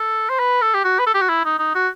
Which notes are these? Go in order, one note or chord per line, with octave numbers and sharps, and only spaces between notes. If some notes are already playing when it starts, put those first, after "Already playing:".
Already playing: A4
C5
B4
A4
G4
F#4
B4
A4
G4
F#4
E4
D#4
D#4
F#4